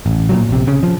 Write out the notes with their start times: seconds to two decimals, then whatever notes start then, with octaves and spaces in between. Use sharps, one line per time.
0.06 A1
0.29 A#2 C#3 F#3
0.49 A#1 C3
0.67 C#3
0.83 F3